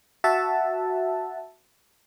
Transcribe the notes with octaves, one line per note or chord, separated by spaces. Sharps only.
F#4 E5 F#5 A5